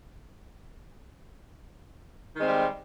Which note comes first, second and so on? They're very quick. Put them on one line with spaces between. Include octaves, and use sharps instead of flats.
D#3 G#3 C4 G3